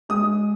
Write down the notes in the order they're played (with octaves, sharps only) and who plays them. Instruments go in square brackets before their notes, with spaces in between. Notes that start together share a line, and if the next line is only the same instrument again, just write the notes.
[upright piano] G#3 D#6